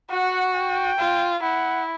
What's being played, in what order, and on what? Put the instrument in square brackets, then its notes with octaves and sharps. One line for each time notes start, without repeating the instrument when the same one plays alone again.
[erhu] F#4 [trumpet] F#5
[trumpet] G5
[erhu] F4
[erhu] E4 [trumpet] F#5